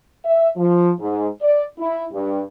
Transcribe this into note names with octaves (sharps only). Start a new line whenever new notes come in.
E5
F3
G#2
D5
E4
G2